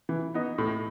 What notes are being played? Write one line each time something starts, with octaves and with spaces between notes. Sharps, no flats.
E3
B3 D#4
A2